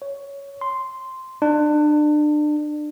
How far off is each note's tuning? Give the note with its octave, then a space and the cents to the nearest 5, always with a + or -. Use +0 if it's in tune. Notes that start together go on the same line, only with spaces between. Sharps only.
C#5 +5
C6 -5
D4 +30